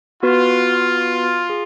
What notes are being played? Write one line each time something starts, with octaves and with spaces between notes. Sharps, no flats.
B3 F4 F#4 B4
G#4